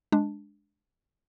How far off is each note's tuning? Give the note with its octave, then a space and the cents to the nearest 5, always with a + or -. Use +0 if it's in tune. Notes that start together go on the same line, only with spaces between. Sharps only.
G#3 +0 D4 +0